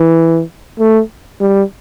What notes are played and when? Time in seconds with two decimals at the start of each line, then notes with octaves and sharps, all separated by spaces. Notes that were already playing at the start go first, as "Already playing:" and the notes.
Already playing: E3
0.79 A3
1.41 G3